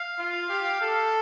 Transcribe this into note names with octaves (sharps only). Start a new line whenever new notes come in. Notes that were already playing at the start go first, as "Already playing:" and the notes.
Already playing: F5
F4
G4
A4